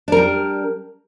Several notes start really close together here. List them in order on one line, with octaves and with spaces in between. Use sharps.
D4 A#4 G3